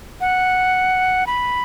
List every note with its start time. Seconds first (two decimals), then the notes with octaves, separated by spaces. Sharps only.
0.21 F#5
1.27 B5